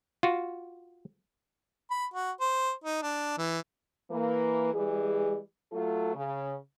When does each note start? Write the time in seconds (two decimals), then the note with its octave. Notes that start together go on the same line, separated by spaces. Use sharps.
0.23 F4 F#4
1.91 B5
2.14 F#4
2.40 C5
2.84 D#4
3.02 D4
3.38 E3
4.10 E3 A#3 B4
4.73 E3 G3 G#3 G#4
5.72 F#3 A3 F4 A4
6.15 C#3